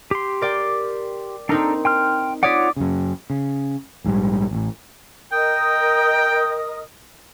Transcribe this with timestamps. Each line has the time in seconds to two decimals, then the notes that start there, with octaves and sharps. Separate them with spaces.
0.11 G4 C6
0.41 A#4 D5 G5
1.49 C4 D4 D#4 A4 A#4 A#5
1.85 G5 C6 F6
2.43 F4 C#5 D5 F#5 D#6 B6
2.76 F#2 C#3
3.30 C#3
4.04 A#1 G#2 C#3 G3
4.51 A1 A2
5.32 A#4 D#5 G5 D#6